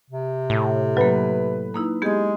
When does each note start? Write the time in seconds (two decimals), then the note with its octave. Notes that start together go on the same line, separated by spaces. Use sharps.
0.10 C3
0.50 A2
0.97 F#3 A#3 B4
1.74 A#3 D#4 E4
2.02 G#3 B3 G4 G#4